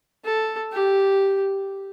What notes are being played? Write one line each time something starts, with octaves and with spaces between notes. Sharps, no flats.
A4
G4